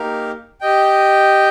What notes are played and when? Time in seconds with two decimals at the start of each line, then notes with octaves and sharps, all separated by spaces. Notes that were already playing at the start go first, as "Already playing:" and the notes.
Already playing: A#3 D#4 G4 A#4 F5
0.61 G4 D#5 G5